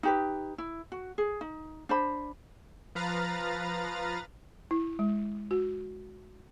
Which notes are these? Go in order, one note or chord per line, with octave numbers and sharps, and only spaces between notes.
D#4 G4 B4
E4
F#4
G#4
D#4
D4 C5 B5
F3 B4 F5 A#5 A6
E4
G#3
F#4